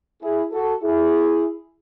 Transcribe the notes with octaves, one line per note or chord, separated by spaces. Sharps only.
E4 G#4
F#4 A4
E4 G#4